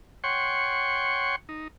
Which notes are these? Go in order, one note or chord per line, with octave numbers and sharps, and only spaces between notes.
C#5 F#5 G5 C6 C#6
D#4